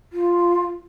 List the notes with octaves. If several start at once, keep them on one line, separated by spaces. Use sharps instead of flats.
F4